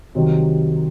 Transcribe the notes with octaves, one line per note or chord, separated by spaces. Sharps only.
C2 C3 D#3 F#3 C4